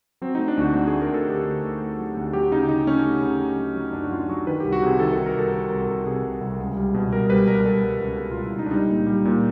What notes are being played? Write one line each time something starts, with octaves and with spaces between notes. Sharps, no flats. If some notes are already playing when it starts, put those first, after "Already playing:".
F#3 C4
A3 D#4
D4
D2 F#4
A3
G#4
A3
A#4
D2 A4
G#4
D3 G4
D2
D2
A3
F#3
D2
F#3 G4
C#3 D#4
C#3 D#4
A3 C#4
A3
C#3
C#3
F#3
F#3
F#2 D4
F#4
F#2 F4
F#3 F#4
D#3 B4
C2 G4
F#4
C3 G#4
D#3 A4
A4
D#3
A#4
C2 A4
D#3 A#4
C2 A#4
C2 A4
C3 G#4
C2
C2
C#2
G3
B2
G3 A#4
G3 B4
G3 A#4
G3 A4
G3
C#2
B2 A4
F4
G3
E4
C#2
D#4
D4
G3 D#4
A#2
G3
A#2